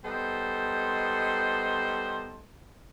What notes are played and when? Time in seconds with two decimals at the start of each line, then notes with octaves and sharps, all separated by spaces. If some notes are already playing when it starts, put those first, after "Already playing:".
0.04 G3 B3 D#4 A4 C5